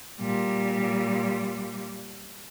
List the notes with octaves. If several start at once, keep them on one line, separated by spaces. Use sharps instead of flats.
A#2 G3